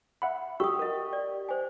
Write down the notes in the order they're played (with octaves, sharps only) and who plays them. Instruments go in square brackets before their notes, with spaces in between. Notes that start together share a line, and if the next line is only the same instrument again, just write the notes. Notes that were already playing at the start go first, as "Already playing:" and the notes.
[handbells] E5 F#5 B5
[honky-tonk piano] G4 [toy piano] C#6 D#6 [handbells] E6
[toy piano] A#4 D#5
D5
C5 G#5